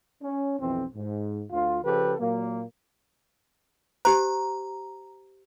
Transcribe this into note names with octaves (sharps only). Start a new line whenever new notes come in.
C#4
B1 F2 E3 C4
G#2
D2 F4
C#3 F3 G4 A4 B4
A#2 F#3 A#3
G4 C5 A#5